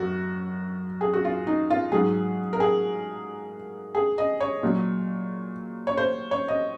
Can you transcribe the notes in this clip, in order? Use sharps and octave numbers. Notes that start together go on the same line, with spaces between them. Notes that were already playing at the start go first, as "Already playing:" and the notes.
Already playing: F#2 F#4
G#4
F#4
F4
D#4
F4
G#2 F#3 G#4
A#4
G#4
G#4
D#5
C#5
A#2 F#3
C#5
C5
C#5
D#5